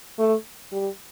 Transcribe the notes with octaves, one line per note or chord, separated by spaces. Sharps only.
A3
G3